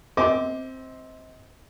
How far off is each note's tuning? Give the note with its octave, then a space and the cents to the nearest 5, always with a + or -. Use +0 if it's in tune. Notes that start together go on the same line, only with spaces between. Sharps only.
C4 +0 D#5 +35 D6 +0